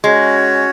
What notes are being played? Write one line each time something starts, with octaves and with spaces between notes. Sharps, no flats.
G#3 C#4 F#4 C#5